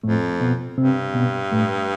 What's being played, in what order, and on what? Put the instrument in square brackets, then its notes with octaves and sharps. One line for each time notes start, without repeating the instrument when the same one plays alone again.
[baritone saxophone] F2 [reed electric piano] A2 A3
[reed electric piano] B2 B3
[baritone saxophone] G2 [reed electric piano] C3 C4
[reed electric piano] B2 B3
A2 A3